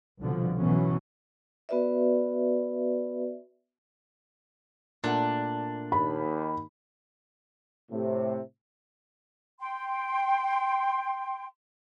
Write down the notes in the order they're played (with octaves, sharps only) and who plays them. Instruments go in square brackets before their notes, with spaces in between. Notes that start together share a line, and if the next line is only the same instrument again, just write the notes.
[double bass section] C2 B2 D3 F3
B2 E3 F#3 B3 C#4
[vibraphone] B3 F#4 B4 D5 E5
[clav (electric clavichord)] A#2 A3 F#5 [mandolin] D4
[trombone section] D#2 [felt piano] B5
[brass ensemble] A2 C3
[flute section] G5 C6